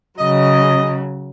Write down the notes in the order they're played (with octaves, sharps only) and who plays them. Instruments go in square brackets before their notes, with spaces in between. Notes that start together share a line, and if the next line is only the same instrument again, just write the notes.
[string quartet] C#3 F#3 [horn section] D#5